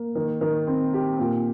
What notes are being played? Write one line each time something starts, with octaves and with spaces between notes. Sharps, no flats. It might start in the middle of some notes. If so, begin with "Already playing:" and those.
Already playing: A#3
D#3
D#3
C4
G4
A#2